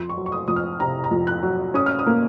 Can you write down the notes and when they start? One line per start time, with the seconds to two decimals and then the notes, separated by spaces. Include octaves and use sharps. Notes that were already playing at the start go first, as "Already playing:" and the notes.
Already playing: F2 C6
0.09 C#6
0.17 F#3
0.26 C#6
0.32 D#6
0.48 F2 D#6
0.56 F6
0.80 C3 A#5
1.04 A#5
1.11 F2
1.27 F#6
1.43 F#3
1.74 C#4 D#6
1.86 F6
1.99 D#6
2.06 A#3